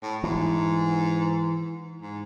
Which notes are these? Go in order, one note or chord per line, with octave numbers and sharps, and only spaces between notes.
A2
G#2 E3
G#2